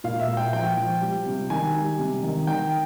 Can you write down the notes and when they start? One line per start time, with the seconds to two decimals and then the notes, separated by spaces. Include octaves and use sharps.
0.04 A#2 F5
0.20 E5
0.28 A#2
0.37 G5
0.53 F3 G5
0.77 F3
1.02 G3
1.26 C3
1.50 D#3 G#5
1.74 G3
1.99 C3
2.23 D#3
2.47 D#3 G5